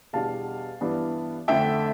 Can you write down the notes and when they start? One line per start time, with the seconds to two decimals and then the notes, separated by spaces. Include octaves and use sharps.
0.13 E2 B2 G3 D4 F5 A5
0.81 G2 E3 B3 D4
1.48 F2 D3 A3 E5 G5